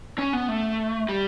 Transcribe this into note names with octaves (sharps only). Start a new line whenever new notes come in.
C#4
B3
A3
G3